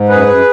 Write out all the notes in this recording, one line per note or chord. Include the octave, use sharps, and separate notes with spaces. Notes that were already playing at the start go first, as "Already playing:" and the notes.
Already playing: G#2
F#2 G#4 B4
F#2